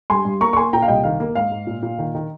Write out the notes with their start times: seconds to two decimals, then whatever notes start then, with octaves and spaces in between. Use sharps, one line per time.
0.10 G2 G#5 C6
0.25 G2
0.41 A#3 A#5 C#6
0.53 C#6
0.56 A#3 G#5 C6
0.73 A#2 G5 A#5
0.82 F5
0.88 C2 D#5 G5
1.04 D#3 F5
1.20 A#3
1.35 G#2 F5
1.52 G#2
1.67 A#2
1.83 A#2
1.99 D#3
2.15 D#3